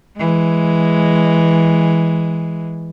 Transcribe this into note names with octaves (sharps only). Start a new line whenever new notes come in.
E3 G#3